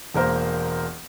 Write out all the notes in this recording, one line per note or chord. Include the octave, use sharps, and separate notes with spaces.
E1 A#3 A#4 C5